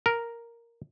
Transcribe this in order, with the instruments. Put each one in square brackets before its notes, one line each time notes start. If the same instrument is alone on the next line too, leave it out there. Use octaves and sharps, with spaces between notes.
[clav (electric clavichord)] A#4